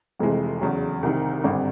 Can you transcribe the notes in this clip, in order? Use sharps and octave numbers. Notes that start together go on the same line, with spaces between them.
F1 F2 C3 E3 G#3
E2 C#3 F#3
C2 C3 D#3
G#1 G2 D3 G3 C4